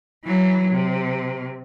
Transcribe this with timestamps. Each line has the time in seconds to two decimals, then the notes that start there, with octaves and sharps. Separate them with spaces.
0.25 E3 F#3
0.71 C3